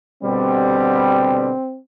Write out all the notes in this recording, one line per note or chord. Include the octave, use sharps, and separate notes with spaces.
B2 D3 G3 C4